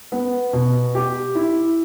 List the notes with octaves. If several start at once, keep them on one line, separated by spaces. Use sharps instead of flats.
B3
B2
G4
E4